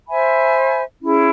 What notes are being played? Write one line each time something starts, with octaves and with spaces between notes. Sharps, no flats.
C5 E5 G#5 B5
C#4 E4 G#4